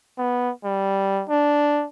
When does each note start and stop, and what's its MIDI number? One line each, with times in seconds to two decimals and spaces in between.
0.18 0.52 59
0.64 1.24 55
1.29 1.86 62